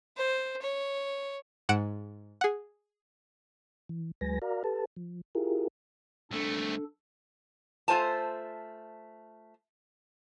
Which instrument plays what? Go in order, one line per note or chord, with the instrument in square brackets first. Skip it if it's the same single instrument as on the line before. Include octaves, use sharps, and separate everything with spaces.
[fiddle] C5
C#5
[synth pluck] G#2 F#5 F#6 C#7 D7 E7
G#4 F#5
[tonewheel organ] E3
D2 F#3 G#3 B4 G#5 A#6
F#4 A#4 D5 F5 A#5
G4 A4 B4 A5
F3
E4 F4 G4 G#4 A#4
[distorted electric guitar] C2 A3 [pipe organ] D4 A4
[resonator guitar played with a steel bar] A3 F4 C5 G#5 A5